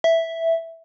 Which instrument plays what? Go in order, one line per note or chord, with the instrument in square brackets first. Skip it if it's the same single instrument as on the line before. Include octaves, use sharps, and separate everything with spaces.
[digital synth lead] E5